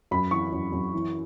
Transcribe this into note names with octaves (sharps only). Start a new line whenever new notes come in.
F#2 B5
E3 C#6
F#2
F#2
E3